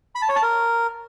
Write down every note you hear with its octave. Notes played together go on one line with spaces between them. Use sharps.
B5
A5
C#5
A5
A#4